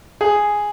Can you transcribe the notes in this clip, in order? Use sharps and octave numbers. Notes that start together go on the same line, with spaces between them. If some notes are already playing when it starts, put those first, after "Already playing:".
G#4